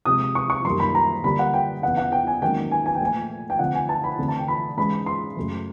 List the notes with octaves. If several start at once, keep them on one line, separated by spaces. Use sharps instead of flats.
C3 F3 G#3 D#6
C#6
C#6
F#2 D#3 G3 A#3 C6
B5
A#5
D3 G3 A#3 B5
F#5
G5
E2 C#3 E3 F#5
F#5
G5
G#5
G#2 D#3 F#3 A#3 C#4 G5
G#5
G#5
G5
A#2 F3 A3 G#5
G5
D3 F3 A3 C4 F#5
G#5
A5
B5
D3 F3 A3 C4
A5
G5
B5
G#2 E3 G#3 C#4 B5
C6
F#2 C#3 F#3 A3